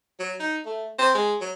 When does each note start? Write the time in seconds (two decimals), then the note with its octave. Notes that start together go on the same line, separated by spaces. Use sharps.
0.20 F#3
0.40 D#4
0.66 A3
0.99 C4
1.15 G#3
1.41 F#3